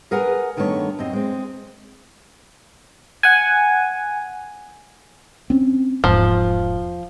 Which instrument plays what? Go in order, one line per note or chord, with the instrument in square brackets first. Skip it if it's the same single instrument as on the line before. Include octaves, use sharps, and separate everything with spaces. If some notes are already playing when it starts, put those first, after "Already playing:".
[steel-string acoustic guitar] G#4 A#4 B4 F#5 G#5 A#5
G2 D#3 A3 B3 G4 C#5
F#2 C4 D#5
G#3 C4
[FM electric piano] F#5 G#5
[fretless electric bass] C4 C#4
[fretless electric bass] E1 G#2 [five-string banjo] F3